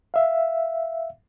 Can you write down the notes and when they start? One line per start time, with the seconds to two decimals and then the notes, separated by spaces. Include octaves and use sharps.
0.14 E5 F5